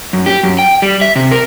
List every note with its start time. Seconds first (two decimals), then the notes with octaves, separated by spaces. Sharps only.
0.13 F#2
0.26 G4
0.43 F#2
0.59 G5
0.82 G3
1.01 E5
1.16 C3
1.31 A#4